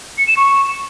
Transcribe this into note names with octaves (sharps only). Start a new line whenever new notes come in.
C#7
E7
C#6